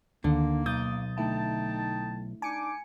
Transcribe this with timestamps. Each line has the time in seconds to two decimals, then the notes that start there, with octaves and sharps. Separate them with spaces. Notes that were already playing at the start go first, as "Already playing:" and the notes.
0.24 D2 D3 D#3 A#3
0.66 B1 D#6 G6 A6
1.18 D3 A3 D#4 E4 G5 A5
2.42 D4 D#4 G#5 D6 C#7